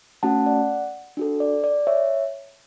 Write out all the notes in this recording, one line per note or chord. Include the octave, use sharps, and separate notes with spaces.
A3 C#4 F#4 F#5 A5
D5 F#5
D4 F#4 A4
D5
D5
C#5 E5